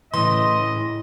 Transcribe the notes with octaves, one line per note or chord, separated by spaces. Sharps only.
A2 C#3 E3 D#5 C6